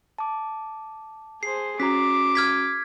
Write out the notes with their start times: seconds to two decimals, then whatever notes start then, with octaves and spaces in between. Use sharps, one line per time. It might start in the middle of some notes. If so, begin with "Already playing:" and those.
0.18 A5 D6
1.43 G#4 C5 C7
1.80 C#4 F#4 A#5 D6 B6
2.35 F6 G#6 B6